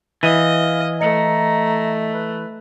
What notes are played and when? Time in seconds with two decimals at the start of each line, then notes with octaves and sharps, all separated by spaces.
0.23 E3 D#5 F5 D#7
1.01 A3 D#5 A#5 C#7
2.14 B4